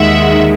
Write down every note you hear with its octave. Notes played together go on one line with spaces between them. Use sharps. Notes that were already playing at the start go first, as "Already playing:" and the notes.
Already playing: D#2 D#3 G#3 E5 F#5